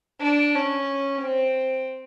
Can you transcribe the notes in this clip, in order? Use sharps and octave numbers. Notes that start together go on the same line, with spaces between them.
D4
C#4
C4